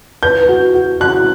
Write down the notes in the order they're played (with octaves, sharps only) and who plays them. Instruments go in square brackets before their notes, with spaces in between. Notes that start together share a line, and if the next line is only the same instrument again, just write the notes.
[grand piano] B4 [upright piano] G6
[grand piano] F#4
F#4
[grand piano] F#4 [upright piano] F#6